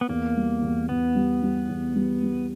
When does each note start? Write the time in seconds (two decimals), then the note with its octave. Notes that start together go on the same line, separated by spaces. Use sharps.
0.01 B3
0.08 E2 A#3
0.36 G3
0.62 E2
0.89 E2 B3
1.15 G3
1.42 G3
1.69 E2
1.95 G3
2.23 G3